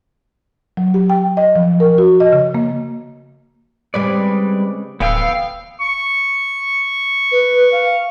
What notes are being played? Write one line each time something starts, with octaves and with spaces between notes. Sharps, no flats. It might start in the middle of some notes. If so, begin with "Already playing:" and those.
F#3
G4
G5
D#5
F3
A#4
F#4
D#5
C#3
A#3
C#3 G3 G#3 C4 B4 D5
D1 F2 D3 E3 B3 F5 G5 E6
C#6
B4
F5